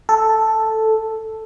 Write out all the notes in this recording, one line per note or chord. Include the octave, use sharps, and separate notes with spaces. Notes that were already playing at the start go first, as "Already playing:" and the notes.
A4